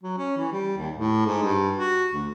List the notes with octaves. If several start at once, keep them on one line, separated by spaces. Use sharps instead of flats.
F#3
C#4
E3
G3
D#2
A2
G#2
G2
F#4
D2